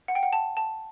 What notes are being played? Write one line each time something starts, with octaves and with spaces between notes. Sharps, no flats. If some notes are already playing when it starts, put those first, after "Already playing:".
F#5
G5
F#5
A5
A5